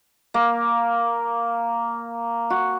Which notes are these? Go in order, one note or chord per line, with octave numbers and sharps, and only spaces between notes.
A#3
F#4